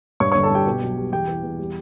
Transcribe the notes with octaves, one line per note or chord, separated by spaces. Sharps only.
G2 C#5 C#6
G1 C#5 C#6
A4 A5
G2 G4 G5
B2
B1
G3
E2 G4 G5
E3
E2
G3